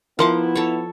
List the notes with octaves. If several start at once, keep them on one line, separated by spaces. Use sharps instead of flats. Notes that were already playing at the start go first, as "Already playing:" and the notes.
F3 B3 E4 A#4 F#5 C6 D6
A4 C#5